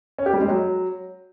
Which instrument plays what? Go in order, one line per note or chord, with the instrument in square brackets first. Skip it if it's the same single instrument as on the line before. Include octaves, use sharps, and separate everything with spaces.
[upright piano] C#4
G4
G3
G#3
F#3